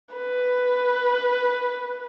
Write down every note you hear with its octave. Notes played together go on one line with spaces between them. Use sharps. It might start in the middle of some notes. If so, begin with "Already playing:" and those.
B4